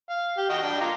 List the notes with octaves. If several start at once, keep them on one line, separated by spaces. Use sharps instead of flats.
F5
G4
F#4 D#5 G5
D4 G5
F4 A#5 D6